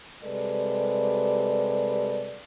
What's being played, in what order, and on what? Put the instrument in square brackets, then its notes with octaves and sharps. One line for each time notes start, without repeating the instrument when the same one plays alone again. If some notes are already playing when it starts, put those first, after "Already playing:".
[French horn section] C3 G3 G#3 A4 B4 D5